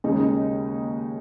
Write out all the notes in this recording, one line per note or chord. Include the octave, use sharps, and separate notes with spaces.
D#2 C#3 G#3 D#4
C#4
D#4